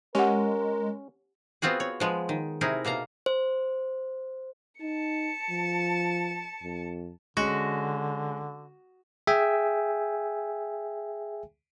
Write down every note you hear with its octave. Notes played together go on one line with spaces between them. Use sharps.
G#3 C#4 G4 A#4 F#5
B3 C4 F4 F#4 G#4
C#5
F3 G#3 B3
D#3
C3 D#4 E4 G#4 A#4
B2 A#3 F5 A#5
C5
D#4 A5 C#7
F3
F2
D3 G#3 C#4 F#4
G#4 E5 G5 G#5